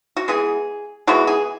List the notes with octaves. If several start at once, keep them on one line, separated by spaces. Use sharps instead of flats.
F#4
E3 G#3 B3 G#4
E3 G#3 B3 F#4
G#4